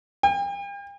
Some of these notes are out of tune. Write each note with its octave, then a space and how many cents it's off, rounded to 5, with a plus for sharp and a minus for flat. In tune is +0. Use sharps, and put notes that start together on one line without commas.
G5 +40